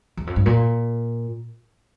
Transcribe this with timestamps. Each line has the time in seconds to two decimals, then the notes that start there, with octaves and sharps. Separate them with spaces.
0.17 E2
0.27 F2
0.36 G2
0.46 A#2